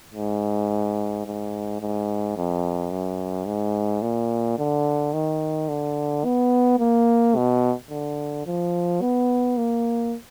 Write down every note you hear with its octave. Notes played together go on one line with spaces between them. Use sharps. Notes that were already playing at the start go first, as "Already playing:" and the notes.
G#2
G#2
G#2
F2
F#2
G#2
A#2
D3
D#3
D3
B3
A#3
B2
D3
F3
B3
A#3